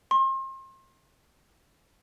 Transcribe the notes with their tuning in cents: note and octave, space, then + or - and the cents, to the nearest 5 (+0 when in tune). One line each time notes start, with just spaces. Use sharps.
C6 +35